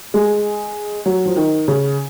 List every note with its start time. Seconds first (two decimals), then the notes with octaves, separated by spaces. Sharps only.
0.14 G#3
1.06 F#3
1.25 F3
1.36 D#3
1.68 C#3